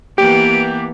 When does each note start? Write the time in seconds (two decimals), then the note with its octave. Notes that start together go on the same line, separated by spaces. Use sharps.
0.18 E3 A#3 B3 G4 D7